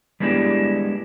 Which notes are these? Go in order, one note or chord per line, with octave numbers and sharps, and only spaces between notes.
G3 G#3 B3 D4 E4 G4